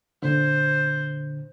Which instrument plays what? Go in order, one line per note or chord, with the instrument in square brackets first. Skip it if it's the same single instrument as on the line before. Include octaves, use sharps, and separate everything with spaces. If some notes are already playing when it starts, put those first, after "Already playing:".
[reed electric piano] A#2 D3 [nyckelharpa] C5